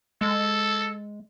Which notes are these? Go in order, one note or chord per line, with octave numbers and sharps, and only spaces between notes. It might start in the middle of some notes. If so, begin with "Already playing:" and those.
G#3 A4